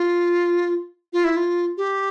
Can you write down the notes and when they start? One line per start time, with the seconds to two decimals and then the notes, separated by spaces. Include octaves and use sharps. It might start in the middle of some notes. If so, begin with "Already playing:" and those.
Already playing: F4
1.13 F4
1.24 E4
1.37 F4
1.77 G4